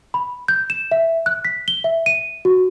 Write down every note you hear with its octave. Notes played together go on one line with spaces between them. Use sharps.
B5
G6
E7
E5
F#6
B6
G7
E5
D#7
F#4